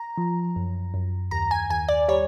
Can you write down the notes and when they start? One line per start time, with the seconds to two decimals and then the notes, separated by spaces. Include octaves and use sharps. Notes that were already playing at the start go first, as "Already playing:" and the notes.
Already playing: A#5
0.17 F3
0.56 F#2
0.94 F#2
1.31 D#2 A#5
1.51 G#5
1.70 D#2 G#5
1.88 D5
2.08 G3 C#5